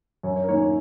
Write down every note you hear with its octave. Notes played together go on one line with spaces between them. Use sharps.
F#2 C#5
C#5
A#4
D#3 A#3 C#4 C#5
C#5